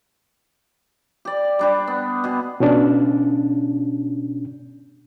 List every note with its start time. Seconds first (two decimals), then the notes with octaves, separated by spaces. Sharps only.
1.25 G4 D5
1.59 G3 D4 G4
1.87 B3
2.24 B2 G#4
2.60 B2 C#4 D4